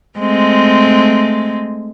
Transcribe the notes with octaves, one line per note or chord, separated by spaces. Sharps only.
G#3 A3 C4